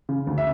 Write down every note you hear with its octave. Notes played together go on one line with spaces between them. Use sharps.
C#3
D2
E5